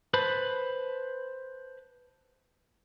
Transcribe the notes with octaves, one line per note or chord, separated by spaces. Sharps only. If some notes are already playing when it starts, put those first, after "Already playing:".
B4 C5 A5 B5